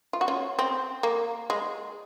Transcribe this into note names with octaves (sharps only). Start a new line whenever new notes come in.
F4
F#4
C#4 F4
C4
A#3
G#3